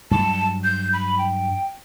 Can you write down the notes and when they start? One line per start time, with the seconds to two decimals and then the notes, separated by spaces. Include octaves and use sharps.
0.11 G2 F#3 A5
0.64 G6
0.93 B5
1.19 G5